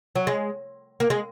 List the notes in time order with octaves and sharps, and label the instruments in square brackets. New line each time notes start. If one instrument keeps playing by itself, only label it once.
[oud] F#3
G#3
A#3
G#3